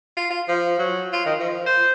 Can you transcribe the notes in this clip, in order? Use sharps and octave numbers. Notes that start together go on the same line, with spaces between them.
F4
F4
F3
F#3
F4
D#3
F3
C5